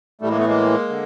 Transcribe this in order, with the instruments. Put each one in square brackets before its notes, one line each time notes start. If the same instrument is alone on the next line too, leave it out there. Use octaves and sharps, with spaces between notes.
[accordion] A2 E3 G3 A3
G#3 A#3
A3 B3
G#3 A#3
D3